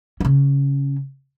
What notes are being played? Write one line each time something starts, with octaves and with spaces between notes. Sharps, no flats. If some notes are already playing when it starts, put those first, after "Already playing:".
C#3 C#4